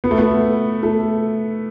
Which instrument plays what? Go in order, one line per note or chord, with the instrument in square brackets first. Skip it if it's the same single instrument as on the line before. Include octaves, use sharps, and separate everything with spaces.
[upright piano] B3
A3
B3
A3